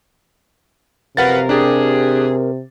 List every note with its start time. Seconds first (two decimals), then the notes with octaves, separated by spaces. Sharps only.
1.17 F#2 C3 F3 A#4 B4 F5 F#5 A6
1.49 D4 G4 G#4